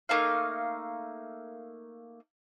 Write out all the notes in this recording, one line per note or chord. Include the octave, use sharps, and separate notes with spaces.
A3 A#3 D#4 F5